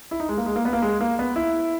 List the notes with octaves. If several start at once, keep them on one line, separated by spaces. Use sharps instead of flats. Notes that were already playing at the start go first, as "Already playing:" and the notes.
E4
D#4
G#3
A#3
G#3
A#3
B3
A#3
G#3
A#3
B3
E4